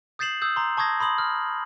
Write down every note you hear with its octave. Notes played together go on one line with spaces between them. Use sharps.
D#6 G6 A6 C7 E7 F#7
D#6 E6 G6
A#5 C6
A5 C#6 D#6 G#6 A#6
B5 C6 D#6 F#7
F6